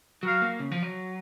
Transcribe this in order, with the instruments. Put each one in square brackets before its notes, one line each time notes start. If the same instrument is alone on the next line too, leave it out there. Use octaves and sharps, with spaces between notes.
[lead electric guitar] F#3 [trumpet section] F#4 A#4 F5
[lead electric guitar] A#3
C#3
F3
F#3